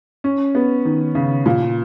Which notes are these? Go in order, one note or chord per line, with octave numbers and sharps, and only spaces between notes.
C#4
B3
D#3
C#3
A#2